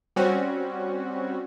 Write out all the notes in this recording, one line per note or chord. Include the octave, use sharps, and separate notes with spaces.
G3 C4 C#4 F#4